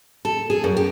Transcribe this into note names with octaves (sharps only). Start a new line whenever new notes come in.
A4
G#4
F#2
G4